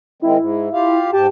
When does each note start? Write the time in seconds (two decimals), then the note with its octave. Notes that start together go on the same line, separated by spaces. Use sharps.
0.22 D#3 G#3 C4 E4
0.38 G#2
0.73 F4 G4 F5
1.13 G#2 G4 G5 A5